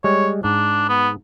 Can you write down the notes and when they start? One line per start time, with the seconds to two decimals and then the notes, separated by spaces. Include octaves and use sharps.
0.04 G3 G#3 C#5
0.44 G#2 D4
0.89 B3